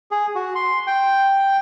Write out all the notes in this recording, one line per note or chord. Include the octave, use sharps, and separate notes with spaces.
G#4
F#4
C6
G5